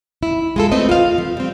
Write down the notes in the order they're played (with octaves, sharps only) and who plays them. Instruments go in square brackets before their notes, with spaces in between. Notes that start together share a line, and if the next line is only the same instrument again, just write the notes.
[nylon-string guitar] E4
G#3 F4 A4
A3 C4 B4 D#5
F4 F5
F3
G3 C4